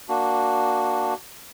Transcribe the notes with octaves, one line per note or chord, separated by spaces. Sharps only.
A#3 D4 F#4